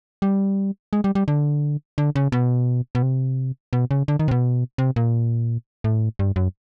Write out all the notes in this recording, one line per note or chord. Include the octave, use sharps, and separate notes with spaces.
G3
G#3
G3
G3
D3
D3
C#3
B2
B2
C3
B2
C#3
D3
D#3
C3
B2
C3
A#2
A2
G2
F#2